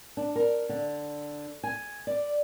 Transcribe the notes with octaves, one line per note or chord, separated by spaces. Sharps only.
D4
A#4
D3
G#5
D5